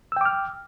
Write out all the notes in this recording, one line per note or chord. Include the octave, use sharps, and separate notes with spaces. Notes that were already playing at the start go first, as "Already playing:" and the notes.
G5 D6 E6 F6